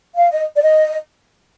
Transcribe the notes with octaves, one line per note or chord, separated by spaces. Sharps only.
F5
D#5
D5
D#5